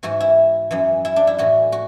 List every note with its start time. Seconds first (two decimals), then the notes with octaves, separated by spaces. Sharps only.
0.03 G#2 E3 F#4
0.21 E4
0.71 F#2 E3
1.05 E4
1.16 D4
1.27 E4
1.38 A2 E3 F#4
1.72 F#4